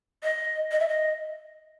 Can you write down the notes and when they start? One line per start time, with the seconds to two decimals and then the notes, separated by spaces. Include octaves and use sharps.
0.23 D#5
0.71 D#5
0.80 E5
0.88 D#5